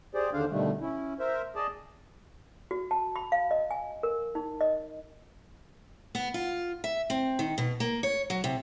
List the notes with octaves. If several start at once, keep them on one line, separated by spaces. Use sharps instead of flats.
G4 G#4 C5 D5
D#2 D3 D4 C5 F5
B2 D3 D#3 G3 A3
C#4 E4
A#4 C5 E5
G#4 D5 D#5 A5
F#4
A5
B5
F5
D#5
G#5
A#4
D#4
D#5
B3
F4
E5
C4
D#3
B2
A#3
C#5
F#3
C3